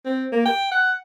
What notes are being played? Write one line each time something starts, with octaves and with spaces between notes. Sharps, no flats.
C4
A#3
G5
F#5